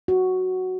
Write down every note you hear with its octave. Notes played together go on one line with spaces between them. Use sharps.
F#4